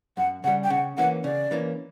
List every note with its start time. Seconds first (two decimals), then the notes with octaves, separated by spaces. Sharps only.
0.17 F#2 F#5
0.44 C#3 F#5
0.47 G3
0.63 G5
0.70 C#3 F#5
0.97 E3 A#3 C#4 F#5
1.24 C#3 D5
1.51 E3 A#3 C#4